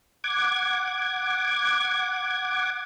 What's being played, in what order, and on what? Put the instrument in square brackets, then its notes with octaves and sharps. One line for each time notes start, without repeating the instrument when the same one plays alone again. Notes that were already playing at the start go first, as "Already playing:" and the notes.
[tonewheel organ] F#5 D6 G#6